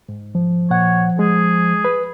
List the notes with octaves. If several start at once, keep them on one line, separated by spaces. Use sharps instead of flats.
G#2
F3
A#2 C#5 F#5
G#3 G#4
B4